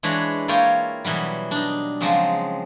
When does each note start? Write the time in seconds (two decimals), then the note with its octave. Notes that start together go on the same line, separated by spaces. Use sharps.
0.03 E3 G#3 D4 B4 C#5
0.48 A#3 E4 F4 C#5 G5 G#5
1.05 B2 E3 F#3 G3
1.51 D4 D#4
2.01 C#3 F3 F#3 G#3 C4